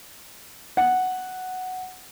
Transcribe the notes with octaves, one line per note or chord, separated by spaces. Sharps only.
F#5